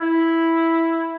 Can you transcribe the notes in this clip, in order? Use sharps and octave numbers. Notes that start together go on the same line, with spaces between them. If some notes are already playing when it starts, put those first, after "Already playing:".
E4